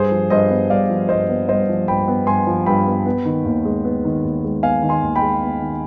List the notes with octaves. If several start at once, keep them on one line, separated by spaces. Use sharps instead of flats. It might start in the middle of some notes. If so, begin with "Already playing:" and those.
Already playing: G2 G#4 C5
F3
G2 C5 D#5
B3
G2 D5 F5
F3
G2 C5 D#5
B3
G2 C5 D#5
F3
G2 G5 B5
B3
G2 G#5 C6
F3
G2 G5 B5
B3
B3
D#3
D#2
G#3
B3
D#3
D#2
G#3
B3 F5 G#5
D#3
G#5 C6
D#2
G5 B5
G#3
B3
D#3